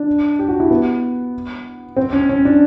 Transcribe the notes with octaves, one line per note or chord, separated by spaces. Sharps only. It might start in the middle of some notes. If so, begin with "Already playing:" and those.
Already playing: D4
G4
F#4
E4
B3
C4
C#4
C#4
D4